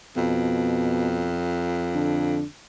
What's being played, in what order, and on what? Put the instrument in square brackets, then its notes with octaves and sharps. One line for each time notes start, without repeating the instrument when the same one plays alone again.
[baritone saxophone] F2 [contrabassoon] B2
[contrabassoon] D3